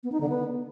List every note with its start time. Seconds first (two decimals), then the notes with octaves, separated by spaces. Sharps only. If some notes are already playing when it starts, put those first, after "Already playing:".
0.03 B3
0.12 D#4
0.21 D3
0.29 B3